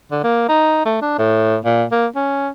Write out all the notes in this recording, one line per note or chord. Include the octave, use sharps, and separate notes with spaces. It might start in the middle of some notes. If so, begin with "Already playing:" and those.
D3
A#3
D#4
A3
D4
A2
A#2
A#3
C#4